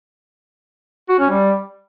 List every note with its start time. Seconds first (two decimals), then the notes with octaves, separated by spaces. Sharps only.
1.09 F#4
1.19 C#4
1.29 G3